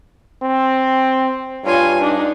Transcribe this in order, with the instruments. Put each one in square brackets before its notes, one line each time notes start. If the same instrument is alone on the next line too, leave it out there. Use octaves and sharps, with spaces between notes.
[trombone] C4
[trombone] G2 [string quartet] F4 C#5 G#5
[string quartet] D4 D#4